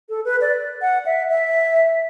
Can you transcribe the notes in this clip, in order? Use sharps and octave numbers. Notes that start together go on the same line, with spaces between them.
A4
B4
D5
F#5
E5
E5